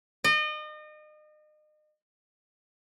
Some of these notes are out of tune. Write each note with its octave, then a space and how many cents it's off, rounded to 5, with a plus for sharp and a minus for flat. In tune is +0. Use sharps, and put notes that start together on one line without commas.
D#5 -35